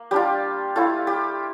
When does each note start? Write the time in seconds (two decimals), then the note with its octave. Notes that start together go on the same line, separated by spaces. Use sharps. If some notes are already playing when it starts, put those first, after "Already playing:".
Already playing: A#3
0.11 G3 D4 F4 G4
0.76 A3 E4 F4
1.07 G4